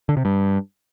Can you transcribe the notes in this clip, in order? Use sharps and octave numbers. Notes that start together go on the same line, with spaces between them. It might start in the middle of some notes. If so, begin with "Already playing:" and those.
D3
C3
G2